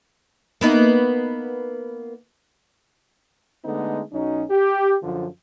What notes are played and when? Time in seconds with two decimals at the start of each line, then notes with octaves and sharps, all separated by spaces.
0.61 A#3 B3 D#4
3.65 D3 G#3 A3 B3 D#4
4.13 B1 F#3 C#4 D#4
4.51 G4
5.03 F#2 D3 F3